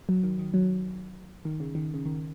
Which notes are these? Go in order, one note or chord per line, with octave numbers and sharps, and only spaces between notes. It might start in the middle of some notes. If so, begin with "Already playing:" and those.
F#3
D#3
D#3
F#3
D#3
C#3
D#3
C#3
D#3